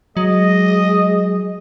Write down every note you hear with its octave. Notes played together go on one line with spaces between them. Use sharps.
F#3 G#3 D#5